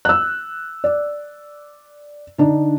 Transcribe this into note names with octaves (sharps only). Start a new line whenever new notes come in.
E6 F#6
D5
D3 D4 D#4